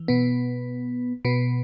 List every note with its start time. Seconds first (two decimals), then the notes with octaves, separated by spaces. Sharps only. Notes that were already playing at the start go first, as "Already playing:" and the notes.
Already playing: E3
0.08 B2 B3
1.25 B2 B3